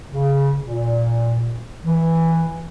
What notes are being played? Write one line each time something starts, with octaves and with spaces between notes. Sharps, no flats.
C#3
A#2
E3